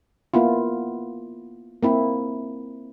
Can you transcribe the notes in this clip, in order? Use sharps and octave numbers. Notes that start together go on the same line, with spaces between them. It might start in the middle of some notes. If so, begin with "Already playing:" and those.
A#3 B3 E4 F4
A#3 C4 E4